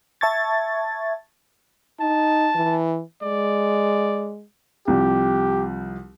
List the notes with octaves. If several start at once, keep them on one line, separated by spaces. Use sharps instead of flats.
E5 A5 C#6 G#6 A6
D#4 A5
E3
G#3 D5
C2 F3 G3 G4